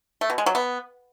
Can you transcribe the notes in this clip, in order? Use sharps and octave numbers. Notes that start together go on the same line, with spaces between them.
A3
B2
G#3
F#3
B3